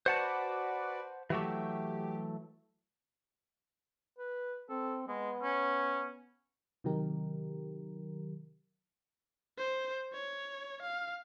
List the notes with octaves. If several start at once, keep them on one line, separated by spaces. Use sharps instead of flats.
F#4 B4 C5 D5 F#5 A5
E3 F#3 A3 G4
B4
C4 A4
G#3 B3
C#4
C3 D#3 F#3 D#4 G4 A#4
C5
C#5
F5